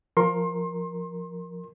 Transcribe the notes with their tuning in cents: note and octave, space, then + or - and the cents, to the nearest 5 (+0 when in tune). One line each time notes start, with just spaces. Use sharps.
F3 +0 A#4 +0 C6 +30